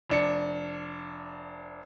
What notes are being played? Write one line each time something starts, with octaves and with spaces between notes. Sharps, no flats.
F1 D4 C#7